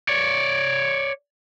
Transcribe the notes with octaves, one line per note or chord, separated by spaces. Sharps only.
C#5 D5